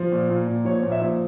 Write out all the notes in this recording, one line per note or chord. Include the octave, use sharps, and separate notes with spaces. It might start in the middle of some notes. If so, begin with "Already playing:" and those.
Already playing: F3
A#2
A#2
A#2
F3 C#5
A#2
E5
F3